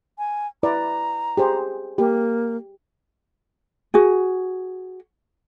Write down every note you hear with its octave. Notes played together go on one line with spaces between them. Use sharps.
G#5
E4 B4 D5 A#5
G4 G#4 C5
A#3 G4
F#4 G#4